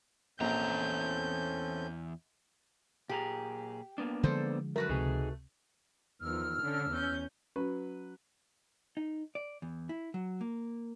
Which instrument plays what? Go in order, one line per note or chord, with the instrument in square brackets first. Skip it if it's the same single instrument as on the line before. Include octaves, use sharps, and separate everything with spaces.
[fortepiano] A#1 [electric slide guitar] E2 A#5 [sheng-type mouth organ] C4 C#4 A4 [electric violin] G6
[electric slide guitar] A#2 G#4 A#5 [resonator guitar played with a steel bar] G4
[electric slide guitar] A#3 B3 D4
[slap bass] D3 F3 G#3 [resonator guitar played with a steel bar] A4 C5 D5
[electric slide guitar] F#2 [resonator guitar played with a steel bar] A3 F#4 B4 [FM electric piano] A#4
[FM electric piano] C#2 C3 [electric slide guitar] D#4 G#4
[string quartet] E2 D#3 F3 [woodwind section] E6 F6
[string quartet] D3 C#4 D4
E2 C#4 G6
[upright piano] F#3 B4 [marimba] C#4
[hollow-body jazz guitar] D#4
D5
E2
E4
F#3
A#3